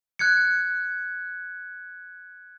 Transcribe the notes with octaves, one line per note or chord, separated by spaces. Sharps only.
F#6 G#6 C#7